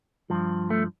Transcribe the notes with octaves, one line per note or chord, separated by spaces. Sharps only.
G2 F3
A3